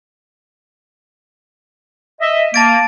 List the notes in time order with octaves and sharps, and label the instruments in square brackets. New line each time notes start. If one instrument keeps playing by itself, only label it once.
[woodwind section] D#5 E5
[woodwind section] A#3 [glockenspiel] A5 A6 D7